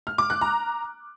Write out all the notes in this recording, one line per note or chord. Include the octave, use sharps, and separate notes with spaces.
F6
D6
F#6
A#5